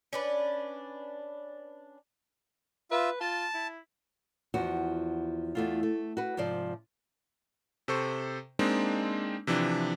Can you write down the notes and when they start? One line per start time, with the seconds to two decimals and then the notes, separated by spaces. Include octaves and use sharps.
0.13 C#4 D4 B4
2.91 F4 B4 E5
3.20 F4 A5
3.54 E4
4.54 E2 F3 F#4
5.55 E2 A3 F4
5.83 A3
6.17 F#4 B4
6.37 G#2 C3 F3 D5
7.88 C3 A4 C5 C#6
8.59 G#3 A#3 C4 D4 D#4
9.47 C3 E3 F3 D4